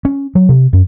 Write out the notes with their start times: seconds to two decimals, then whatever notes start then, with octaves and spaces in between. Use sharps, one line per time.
0.05 C#4
0.35 F#3
0.49 C3
0.73 F#2